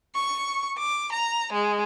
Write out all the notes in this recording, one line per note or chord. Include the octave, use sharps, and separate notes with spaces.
C#6
D6
A#5
G#3